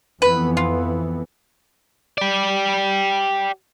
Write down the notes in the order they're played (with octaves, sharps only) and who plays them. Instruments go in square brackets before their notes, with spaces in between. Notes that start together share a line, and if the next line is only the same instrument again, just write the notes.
[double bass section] F2 E3 B3 [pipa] B4
[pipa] F4
[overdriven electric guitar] G4 D5